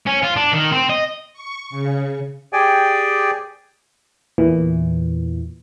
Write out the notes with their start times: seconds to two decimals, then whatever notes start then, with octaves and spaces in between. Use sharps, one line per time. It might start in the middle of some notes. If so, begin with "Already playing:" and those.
0.06 C#4
0.22 F4
0.36 D4
0.53 D#3
0.72 C4
0.89 D#5
1.33 C#6
1.70 C#3
2.53 G4 G#4 D5 G5 G#5
4.38 E2 A#2 E3